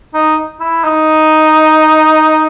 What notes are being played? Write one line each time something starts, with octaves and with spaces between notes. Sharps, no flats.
D#4
E4
D#4